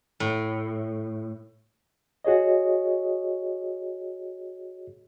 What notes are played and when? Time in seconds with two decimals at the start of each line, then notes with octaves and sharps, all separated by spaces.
0.20 A2
2.25 F#4 G#4 C#5 D#5